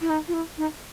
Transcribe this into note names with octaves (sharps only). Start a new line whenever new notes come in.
E4
D#4
F4
E4
D#4